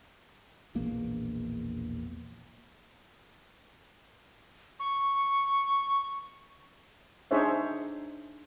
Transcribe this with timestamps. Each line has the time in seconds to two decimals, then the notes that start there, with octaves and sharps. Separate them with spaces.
0.75 E1 A#1 E2 A#3
4.80 C#6
7.31 D4 D#4 G#4 C5 C#5 E5